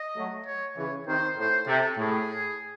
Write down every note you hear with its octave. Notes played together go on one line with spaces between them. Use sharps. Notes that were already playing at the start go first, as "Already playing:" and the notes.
Already playing: D#5
F#3 A3
C#5
C#3 E3 C#5
C3 D#3 C5
A2 C5
C3 A4
A2 G#4